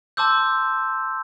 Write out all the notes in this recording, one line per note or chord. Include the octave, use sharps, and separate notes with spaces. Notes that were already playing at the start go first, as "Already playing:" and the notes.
A5 C6 D6 E6 G6